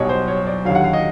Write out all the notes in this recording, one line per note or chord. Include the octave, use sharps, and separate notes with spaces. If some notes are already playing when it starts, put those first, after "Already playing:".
Already playing: B1 B2 G3 C#5
C5
C#5
D5
D#2 D3 F#3 F5
F#5
F5
D#5